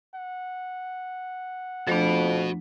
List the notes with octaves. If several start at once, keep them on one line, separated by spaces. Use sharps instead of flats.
F#5
F2 F3 A3 D4 F#4 B5